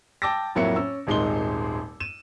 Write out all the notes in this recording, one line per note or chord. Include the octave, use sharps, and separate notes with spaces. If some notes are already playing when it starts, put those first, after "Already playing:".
G5 A5 D6 E6 A6 A#6
F2 A2 F#3 A#3 E5 C#7
C#4 E6
D#1 G#1 G#3 D#4 C6 G7
D#7 E7